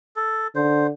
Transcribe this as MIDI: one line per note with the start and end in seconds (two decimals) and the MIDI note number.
0.16 0.47 69
0.56 0.89 50
0.56 0.87 72